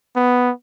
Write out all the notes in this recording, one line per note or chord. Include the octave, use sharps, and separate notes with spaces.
B3